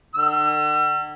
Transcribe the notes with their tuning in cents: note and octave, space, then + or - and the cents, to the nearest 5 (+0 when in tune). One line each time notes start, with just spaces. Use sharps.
D3 +45 E6 +40